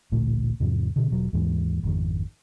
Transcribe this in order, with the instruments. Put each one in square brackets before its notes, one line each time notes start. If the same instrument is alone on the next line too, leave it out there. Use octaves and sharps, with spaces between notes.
[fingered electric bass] A1 D2 A#2 A3
E2 G#2 C3 F3
B2 D3
E1 B2 F#3
D#2 G#2 E3 G#3
G#1 F2 D#3